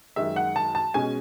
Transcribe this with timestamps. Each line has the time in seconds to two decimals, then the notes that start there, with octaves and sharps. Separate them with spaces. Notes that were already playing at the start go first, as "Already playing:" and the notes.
0.16 F#2 D#3 G#3 E5
0.36 F#5
0.56 A5
0.75 A5
0.94 B2 G#3 C#4 G#5